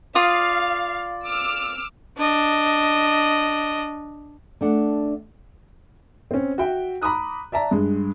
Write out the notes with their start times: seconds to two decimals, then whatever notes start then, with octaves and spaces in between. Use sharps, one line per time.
0.15 F4 D5 F5 D#6
1.25 D6 E6 F6
2.18 D4 D#5
4.61 A3 D4 F#5
6.31 C4 C#4
6.58 F#4 E5 G5
7.02 A#5 B5 D6 D#6 F#6
7.52 D5 E5 A5 A#5
7.71 G2 G#3